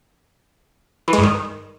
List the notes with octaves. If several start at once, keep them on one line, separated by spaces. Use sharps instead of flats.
E3
G#3
G2
D#3